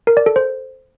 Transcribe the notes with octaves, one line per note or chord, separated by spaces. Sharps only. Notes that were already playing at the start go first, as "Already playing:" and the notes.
A#4
D5
A4
C5